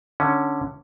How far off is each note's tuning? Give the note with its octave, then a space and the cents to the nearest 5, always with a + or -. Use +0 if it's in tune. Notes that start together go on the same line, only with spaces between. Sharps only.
D3 +10 C#4 +0